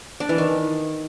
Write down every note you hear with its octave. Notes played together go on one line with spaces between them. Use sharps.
D4
E3
D#3